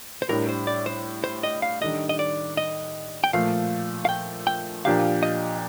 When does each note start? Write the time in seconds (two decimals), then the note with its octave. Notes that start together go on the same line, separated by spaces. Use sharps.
0.22 C5
0.29 A2 G3 D4 A#4
0.49 C5
0.67 D5
0.86 C5
1.24 C5
1.43 D#5
1.62 F5
1.81 D#3 G3 D4 A4 D#5
2.09 D#5
2.19 D5
2.57 D#5
3.24 G5
3.33 A#2 F3 A3 F5
4.05 F5
4.09 G5
4.47 G5
4.85 A#2 F3 A#3 D4 G4 F5
5.23 D#5